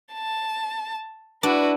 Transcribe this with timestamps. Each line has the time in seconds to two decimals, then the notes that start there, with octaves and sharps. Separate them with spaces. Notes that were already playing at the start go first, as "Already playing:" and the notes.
0.14 A5
1.43 D4 E4 F#4 B4